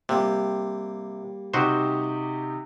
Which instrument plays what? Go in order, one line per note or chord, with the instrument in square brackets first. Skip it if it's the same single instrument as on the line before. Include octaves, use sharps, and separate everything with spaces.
[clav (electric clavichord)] C3 [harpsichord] G3 A#3
[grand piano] C3 D#4 G4 [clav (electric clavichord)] F#4 C5